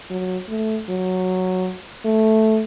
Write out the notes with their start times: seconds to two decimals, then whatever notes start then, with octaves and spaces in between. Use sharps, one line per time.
0.10 F#3
0.49 A3
0.89 F#3
2.05 A3